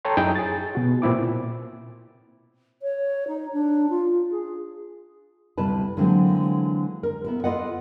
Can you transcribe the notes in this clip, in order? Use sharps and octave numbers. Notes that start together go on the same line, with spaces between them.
A4 C#5 G5 A5 A#5 C6
F#2 D#4 E4 G#4 G5 D#6
G#4 A6
B2 F#4
A#2 C4 E4 D6
C#5
D#4
D4
F4
G#4
D2 C3 G3 E4 B4 A5
D3 E3 F#3 G#3 A#3 C4
A#4
B3 E4 A#4
F4 A4 B4 D#5 F5 F#5